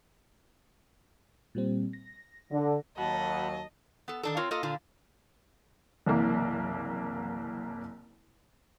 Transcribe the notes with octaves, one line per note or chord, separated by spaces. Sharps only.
A#2 G3 C4
A#6
D3
D#2 F#3 F#4 D#5 F#5 A5 B5
B3 A4
D#3 D4 A4
C4 F4 A#4 C#5
A#3 F4 A4 D#5
A#2 D3 F4
F#1 C2 E3 A#3